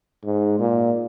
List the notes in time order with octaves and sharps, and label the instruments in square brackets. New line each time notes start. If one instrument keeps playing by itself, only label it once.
[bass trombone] G#2
A#2